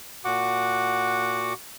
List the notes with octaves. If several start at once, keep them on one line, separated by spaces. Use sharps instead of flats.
A#2 F#4 F#5 D6